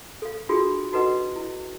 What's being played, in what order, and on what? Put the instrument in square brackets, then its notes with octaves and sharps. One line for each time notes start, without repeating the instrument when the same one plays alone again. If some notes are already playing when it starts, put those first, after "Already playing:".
[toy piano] A4 F5
D4 F4 F#4 G#4 A4
D#4 F#4 A4 B4 D#5 F#5
E4